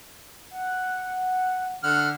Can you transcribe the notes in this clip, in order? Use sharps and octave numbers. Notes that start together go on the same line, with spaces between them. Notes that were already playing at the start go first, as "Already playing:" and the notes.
F#5
D3 F#5 F6